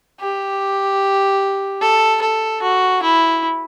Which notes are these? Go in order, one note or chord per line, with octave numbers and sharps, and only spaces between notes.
G4
A4
A4
F#4
E4